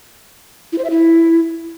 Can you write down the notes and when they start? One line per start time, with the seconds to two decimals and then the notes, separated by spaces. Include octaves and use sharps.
0.72 E4
0.78 C5
0.84 E5
0.90 E4